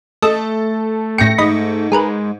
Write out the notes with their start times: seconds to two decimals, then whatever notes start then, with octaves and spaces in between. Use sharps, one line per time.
0.22 A3 A4 D#5 E6
1.18 A2 G5 A#6 C#7
1.38 G#2 D#5 B5
1.92 G#3 G#4 A#4 B4